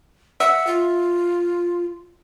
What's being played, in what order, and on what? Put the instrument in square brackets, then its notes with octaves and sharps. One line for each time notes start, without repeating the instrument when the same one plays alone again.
[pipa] E5 [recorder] F#5
[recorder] F4